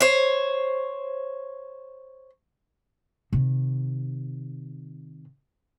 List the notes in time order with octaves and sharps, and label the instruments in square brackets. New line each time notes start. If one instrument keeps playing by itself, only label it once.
[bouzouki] C5 C#5
[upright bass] C3 D#3